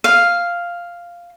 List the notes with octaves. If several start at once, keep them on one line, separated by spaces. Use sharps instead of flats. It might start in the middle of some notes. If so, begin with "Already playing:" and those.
F5